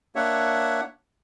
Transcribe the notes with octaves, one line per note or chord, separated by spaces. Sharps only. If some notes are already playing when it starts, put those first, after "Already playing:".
A#3 D4 C#5 E5 F#5